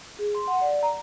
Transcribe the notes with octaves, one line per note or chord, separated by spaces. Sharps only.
G#4
C6
F#5
D5
A#5